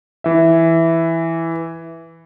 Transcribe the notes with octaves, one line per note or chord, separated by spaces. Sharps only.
E3 E5